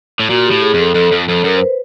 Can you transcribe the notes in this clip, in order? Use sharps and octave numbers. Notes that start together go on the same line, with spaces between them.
A2
A#2 F#4
G4
A2
G#4
F2
A4
F2 A4
F2
F2 A4
F#2 A#4
C5
B4